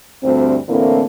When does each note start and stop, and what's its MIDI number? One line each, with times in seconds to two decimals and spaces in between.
0.23 0.56 38
0.23 0.56 43
0.23 0.56 60
0.68 1.03 45
0.68 1.03 50
0.68 1.03 52
0.68 1.03 57
0.68 1.03 58
0.68 1.03 60